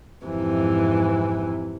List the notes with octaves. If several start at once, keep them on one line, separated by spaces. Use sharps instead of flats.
F2 G#2 C3 E3